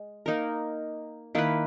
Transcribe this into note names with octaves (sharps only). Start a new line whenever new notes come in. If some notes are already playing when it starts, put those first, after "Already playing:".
Already playing: G#3
A#3 D#4 A#4
D#3 A#3 E4 B4